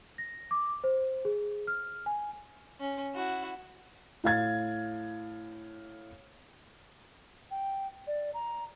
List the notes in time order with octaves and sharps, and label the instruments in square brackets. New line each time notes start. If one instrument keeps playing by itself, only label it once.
[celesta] A#6
D6
C5
G#4
F6
G#5
[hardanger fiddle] C#4
E4 F#4
[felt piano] A2 F5 G#6 A6
[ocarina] G5
D5
A#5